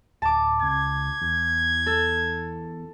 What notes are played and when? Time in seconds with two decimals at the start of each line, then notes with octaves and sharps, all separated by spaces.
0.22 D1 A5 D6
0.62 C#2 G#6
1.21 E2
1.86 A4